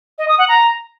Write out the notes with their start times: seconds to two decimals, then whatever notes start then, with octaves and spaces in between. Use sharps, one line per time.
0.18 D#5
0.28 D#6
0.38 F#5
0.48 A#5